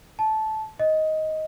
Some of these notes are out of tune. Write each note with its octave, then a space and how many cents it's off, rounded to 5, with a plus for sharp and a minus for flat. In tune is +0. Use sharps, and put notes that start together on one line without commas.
A5 -15
D#5 +10